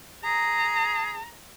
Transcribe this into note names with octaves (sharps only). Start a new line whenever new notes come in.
G#4 A#5